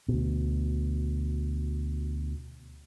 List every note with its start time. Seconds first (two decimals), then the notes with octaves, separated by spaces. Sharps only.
0.08 D2 B2